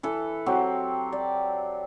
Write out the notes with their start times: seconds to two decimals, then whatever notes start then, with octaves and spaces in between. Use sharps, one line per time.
0.03 E3 A4 B4
0.46 F#3 C4 G4
1.12 D5